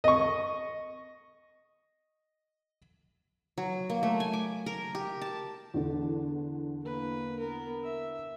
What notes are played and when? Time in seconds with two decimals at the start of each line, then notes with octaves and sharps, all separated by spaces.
0.04 D#5 C#6
3.58 F#3
3.90 A#3
4.03 A3
4.20 G#5
4.33 D6
4.66 A#4
4.95 G4
5.22 A5
5.74 E2 D3
6.82 A#3 B4
7.40 B3 A#4
7.83 E5